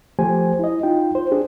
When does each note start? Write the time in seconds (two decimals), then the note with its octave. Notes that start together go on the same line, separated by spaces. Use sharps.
0.19 F3 A3 G4 C5 G#5
0.59 E4 D#5
0.83 D#4 F4 G5
1.15 C5
1.31 D4 G4 G#4